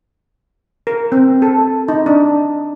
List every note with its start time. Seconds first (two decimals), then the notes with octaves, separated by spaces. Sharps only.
0.87 A#4
1.12 C4
1.42 A4
1.88 D#4
2.06 D4